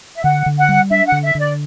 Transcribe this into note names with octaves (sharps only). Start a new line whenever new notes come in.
E5
D3 F#5
D3
F#5
G3
D4 E5
F#5
D3
E5
D3 D5